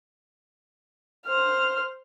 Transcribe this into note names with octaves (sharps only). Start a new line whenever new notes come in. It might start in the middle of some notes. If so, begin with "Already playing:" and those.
C5 F6